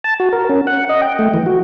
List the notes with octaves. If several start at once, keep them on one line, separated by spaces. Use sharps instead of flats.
A5
F#4
A#4
C#4
F#5
D#5
G5
A3
E3
F#4